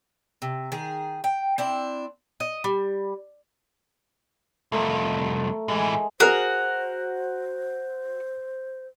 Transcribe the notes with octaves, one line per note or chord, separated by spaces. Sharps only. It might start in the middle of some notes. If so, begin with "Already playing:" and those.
C3
D#3 G#4
G5
C4 D4 E4
D#5
G3
C2 F2 A3 A#4
A2 E3 G#3
F#4 G#4 A#4 C5